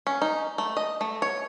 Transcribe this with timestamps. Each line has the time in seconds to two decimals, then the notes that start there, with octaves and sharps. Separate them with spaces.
0.07 C#4
0.22 D#4
0.58 A3
0.77 D#5
1.01 A3
1.22 C#5